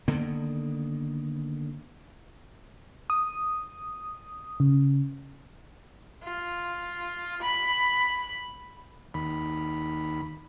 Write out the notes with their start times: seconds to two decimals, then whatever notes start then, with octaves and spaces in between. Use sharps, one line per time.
0.08 D3 D#3 A#3 B3
3.10 D#6
4.60 C#3
6.24 F4
7.42 B5
9.14 D#2 B5